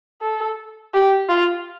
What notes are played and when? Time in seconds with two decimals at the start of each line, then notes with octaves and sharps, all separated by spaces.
0.22 A4
0.94 G4
1.29 F4